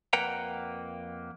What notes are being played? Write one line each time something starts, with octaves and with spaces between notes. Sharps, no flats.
F2 A#3 B4 F#5 G5 A#5